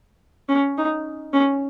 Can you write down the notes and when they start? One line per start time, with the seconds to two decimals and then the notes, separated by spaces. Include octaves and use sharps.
0.49 C#4
0.78 D#4
1.33 C#4